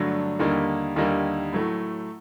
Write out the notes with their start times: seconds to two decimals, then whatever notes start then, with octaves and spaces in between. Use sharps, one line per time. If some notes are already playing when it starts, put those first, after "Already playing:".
Already playing: G2 D3 F#3 A3 D4
0.39 D#2 D3 G3 A#3 D#4
0.96 D#2 D3 G3 A#3 D#4
1.53 A2 F#3 A3